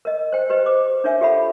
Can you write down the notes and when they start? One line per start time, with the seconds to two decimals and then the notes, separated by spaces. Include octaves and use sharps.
0.05 A#4 D#5
0.32 C5 G5
0.50 G4 B4 C5 D#5
0.66 C5 D6
1.04 D4 D#4 A#4 C#5 E5 G#5
1.21 F4 G4 A4 E5 F#5 B5